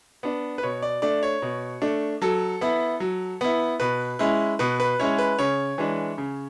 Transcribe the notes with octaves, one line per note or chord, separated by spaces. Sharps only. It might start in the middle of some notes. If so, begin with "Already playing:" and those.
B3 D4
B4
B2 C#5
D5
A3 D4 D5
C#5
B2
A3 D4
F#3 A4
B3 E4
F#3
B3 E4
B2 B4
G#3 C#4 E4
B2 B4
B4
G#3 C#4 E4 C#5
B4
C#3 C#5
E3 G#3 D4
C#3